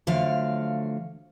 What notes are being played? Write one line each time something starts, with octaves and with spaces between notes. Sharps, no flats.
D3 F3 F#3 A3 F5